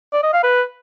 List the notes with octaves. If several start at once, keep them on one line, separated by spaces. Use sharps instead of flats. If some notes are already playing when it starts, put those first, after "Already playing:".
D5
D#5
F5
B4